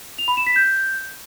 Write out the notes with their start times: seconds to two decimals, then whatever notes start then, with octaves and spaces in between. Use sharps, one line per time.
0.18 F7
0.28 B5
0.37 E7
0.47 B6
0.56 G6